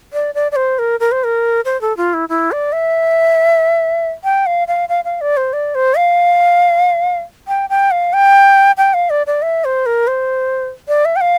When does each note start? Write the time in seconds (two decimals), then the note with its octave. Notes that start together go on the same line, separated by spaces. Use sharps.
0.13 D5
0.35 D5
0.52 D5
0.56 C5
0.79 A#4
1.00 A#4
1.12 C5
1.24 A#4
1.65 C5
1.81 A4
1.97 F4
2.14 E4
2.29 E4
2.52 D5
2.72 E5
4.24 G5
4.46 F5
4.68 F5
4.89 F5
5.05 F5
5.21 D5
5.37 C5
5.53 D5
5.75 C5
5.97 F5
7.48 G5
7.70 G5
7.91 F5
8.13 G5
8.78 G5
8.94 F5
9.10 D5
9.27 D5
9.42 E5
9.65 C5
9.86 A#4
10.07 C5
10.88 D5
11.05 E5
11.16 G5
11.21 F5